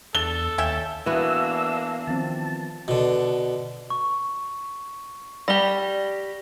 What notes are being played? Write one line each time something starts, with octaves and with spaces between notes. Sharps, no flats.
E2 D4 A4 G7
D#2 C#4 E5 G5
E3 A#3 B3 D4 F#4 E5 E6
D#3 F3 C4 A5
B2 D3
C#6
G3 G4 A#6 G7